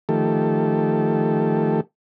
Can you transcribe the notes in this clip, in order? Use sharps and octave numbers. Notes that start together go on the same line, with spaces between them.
D#3 F3 A3 G4 A4